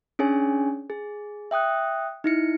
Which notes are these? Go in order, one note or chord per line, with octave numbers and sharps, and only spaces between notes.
C#4 D4 G#4 C#5 G#5
G#4
E5 G5 D#6 F#6
D#4 E4 C#7